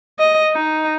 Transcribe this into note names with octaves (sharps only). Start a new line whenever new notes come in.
D#5
D#4